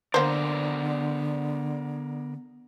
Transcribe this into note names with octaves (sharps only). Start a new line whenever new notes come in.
D3 A#3 B3 A#4 C5 D5